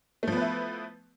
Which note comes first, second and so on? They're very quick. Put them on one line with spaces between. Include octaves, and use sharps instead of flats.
A3 F3 B3 B4 E4